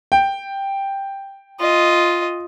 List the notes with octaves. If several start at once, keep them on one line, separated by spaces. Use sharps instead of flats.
G5
F4 D#5